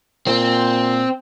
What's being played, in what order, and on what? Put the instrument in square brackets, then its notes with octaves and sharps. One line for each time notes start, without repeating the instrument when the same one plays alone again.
[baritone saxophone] A#2 [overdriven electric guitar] C4